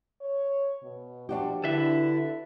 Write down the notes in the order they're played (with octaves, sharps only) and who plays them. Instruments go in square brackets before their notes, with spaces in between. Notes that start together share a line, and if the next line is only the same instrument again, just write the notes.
[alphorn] C#5
B2
[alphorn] F3 [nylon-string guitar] D4 F#4 G4
[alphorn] D3 [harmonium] E4 [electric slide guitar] A4 B4 E5